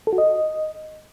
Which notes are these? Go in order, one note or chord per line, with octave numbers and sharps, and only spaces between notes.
A4
F#4
D#5